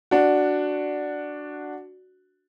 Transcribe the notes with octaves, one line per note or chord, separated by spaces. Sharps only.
D4 F#4